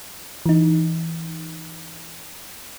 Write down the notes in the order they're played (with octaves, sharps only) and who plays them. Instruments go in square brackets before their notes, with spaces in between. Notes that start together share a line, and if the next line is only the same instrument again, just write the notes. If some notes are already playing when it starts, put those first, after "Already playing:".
[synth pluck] E3 D#4